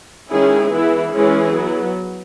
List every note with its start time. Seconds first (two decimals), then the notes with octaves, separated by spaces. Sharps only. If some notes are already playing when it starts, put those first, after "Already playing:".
0.30 D#3 G#3 C#4 E4 G#4
0.71 E3 B3 E4 G#4
1.13 E3 G#3 C#4 E4 G#4
1.54 F#3 B3